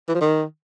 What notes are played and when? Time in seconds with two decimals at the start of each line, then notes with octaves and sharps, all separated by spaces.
0.08 E3
0.15 F3
0.21 D#3